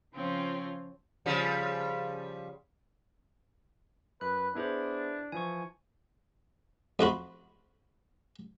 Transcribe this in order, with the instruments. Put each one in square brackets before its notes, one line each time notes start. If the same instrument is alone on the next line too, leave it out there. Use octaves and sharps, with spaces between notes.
[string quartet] C#3 F3 C4 C#4 F4
[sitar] C#3 F3 G3
[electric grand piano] F#2 [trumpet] B4 [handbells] F#6
[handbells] B3 G#4 C5 [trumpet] D4 [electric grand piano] E4 B4
[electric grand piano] E3 F3 [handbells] G#5 C#6
[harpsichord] F2 F4 F#4 B5